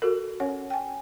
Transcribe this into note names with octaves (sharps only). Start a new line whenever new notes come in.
F#4 A4 A#4
C#4 C#5 F#5
G5 G#5